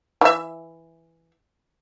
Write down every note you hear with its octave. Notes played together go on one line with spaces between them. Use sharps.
E3 E5